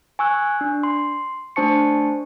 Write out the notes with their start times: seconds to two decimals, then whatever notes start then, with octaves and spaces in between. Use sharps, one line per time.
0.19 G#5 C#6 E6 F#6
0.61 D4
0.83 C6
1.56 A3 D4 C5 A5 C#6 C#7